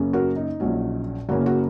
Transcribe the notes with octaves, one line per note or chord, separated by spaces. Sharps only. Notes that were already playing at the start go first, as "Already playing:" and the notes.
Already playing: F#2 C#3 A#3 C#4
F#4 A#4
D#4
A#1 A#2 F#3 C#4
F#1 F#2 C#3 A#3 C#4 F#4
F#4